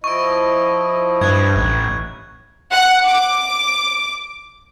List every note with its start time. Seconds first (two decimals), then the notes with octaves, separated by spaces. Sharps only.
0.04 F3 E4 D#5 C#6 D7
1.21 G2 F#6 G#6
1.56 A1 D#4 E4
2.71 F#5
3.06 D6